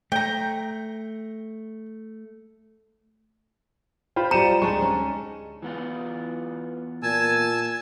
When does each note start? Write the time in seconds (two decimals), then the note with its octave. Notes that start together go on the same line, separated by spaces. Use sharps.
0.12 A3 G5 A#5
4.16 F4 C5 G5 B5
4.31 G3 C5 D5 D#5 A#5 C#7 D#7 E7
4.62 D2 G#3 D4 D#4 C#6
4.82 C#4
5.62 E3 B3 F4
7.03 A#2 G#5 A5 E6 G#6